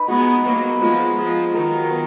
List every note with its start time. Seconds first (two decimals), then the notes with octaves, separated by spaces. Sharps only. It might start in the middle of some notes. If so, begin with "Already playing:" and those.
Already playing: D#4 B4
0.08 G#3 B3 F#4
0.45 F#3 A#3 B3
0.81 F3 G#3 F4
1.17 F3 G#3 F5
1.54 D#3 F#3 A#4
1.90 B3